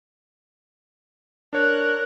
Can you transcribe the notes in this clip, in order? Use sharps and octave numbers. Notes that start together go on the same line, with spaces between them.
D4 A#4 C#5 F#6